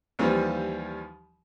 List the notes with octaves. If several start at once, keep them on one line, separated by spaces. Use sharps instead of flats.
D#2 E3 F3 G3